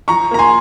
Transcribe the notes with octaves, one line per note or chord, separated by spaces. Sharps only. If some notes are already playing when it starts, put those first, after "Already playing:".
F3 A#5 C#6
A#3 A#5
G#5 C6